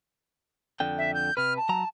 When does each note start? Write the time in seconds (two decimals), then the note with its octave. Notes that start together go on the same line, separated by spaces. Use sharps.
0.80 F2 D3 G5
0.98 E5
1.15 G6
1.37 C3 B4 F6
1.57 A5
1.69 F#3 A#5